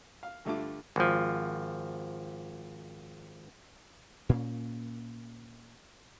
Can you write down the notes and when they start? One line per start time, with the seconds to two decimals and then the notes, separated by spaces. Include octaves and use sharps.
0.23 F5
0.45 G2 D3 A3 F4 A5 D6
0.96 G#1 F3
4.29 A#2 A#3 C#4